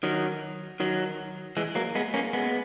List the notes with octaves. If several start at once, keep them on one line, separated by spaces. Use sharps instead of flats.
D#3 F#3
D#3 F#3
E3 G#3
F#3 A#3
G#3 B3
A#3 C#4
G#3 B3